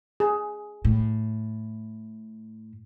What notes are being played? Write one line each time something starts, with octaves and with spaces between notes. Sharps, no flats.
G#4
A2